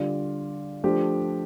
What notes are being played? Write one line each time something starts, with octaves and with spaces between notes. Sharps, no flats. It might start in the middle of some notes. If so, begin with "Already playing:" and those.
Already playing: D3 G3 F4 D5
F3 A3 D4 G4